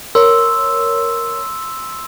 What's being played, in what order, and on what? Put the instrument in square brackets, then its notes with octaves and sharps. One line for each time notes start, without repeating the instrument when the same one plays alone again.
[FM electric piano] A#4 C#5 [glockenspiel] C6 E6